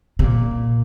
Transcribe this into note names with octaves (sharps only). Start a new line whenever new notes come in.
C3
A#2